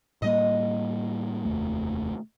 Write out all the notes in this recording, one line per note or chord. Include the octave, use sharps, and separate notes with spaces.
A2 G3 A#3 D#5
F1 D#2 A3